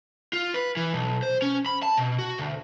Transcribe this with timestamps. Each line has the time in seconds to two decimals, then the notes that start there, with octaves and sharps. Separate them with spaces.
0.33 F4
0.54 B4
0.77 E3
0.93 B1
1.23 C5
1.42 C#4
1.66 B5
1.83 A5
1.97 B2
2.19 F#4
2.38 D2